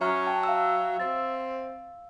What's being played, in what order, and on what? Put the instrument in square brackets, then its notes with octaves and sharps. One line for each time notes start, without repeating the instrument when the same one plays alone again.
[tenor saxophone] F#3 [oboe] C#4 [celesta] E5 A#5 F6
[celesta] G5 [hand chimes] A5
[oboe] E5 [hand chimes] F5 E6
[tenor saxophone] C4 [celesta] A6